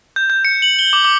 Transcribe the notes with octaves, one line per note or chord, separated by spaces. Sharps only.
G6
G6
C#7
F#7
G7
D6
D6